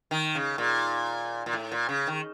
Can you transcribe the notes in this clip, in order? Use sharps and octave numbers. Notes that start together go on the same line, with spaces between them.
D#3
C#3
A#2
A#2
A2
A#2
C#3
D#3